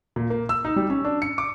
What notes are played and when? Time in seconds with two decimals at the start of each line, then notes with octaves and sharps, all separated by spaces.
0.16 A#2
0.30 A#3
0.49 E6
0.65 D#4
0.76 G3
0.90 C#4
1.05 D4
1.22 C#7
1.38 D6